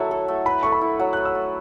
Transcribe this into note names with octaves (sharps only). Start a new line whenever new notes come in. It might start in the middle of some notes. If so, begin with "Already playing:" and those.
Already playing: F#3 A3 E4 E5 F#5 A5
A4
A3
B4 B5
A3 C#6
B5
E4
F#3 F#5
B4 F#6
E6
A3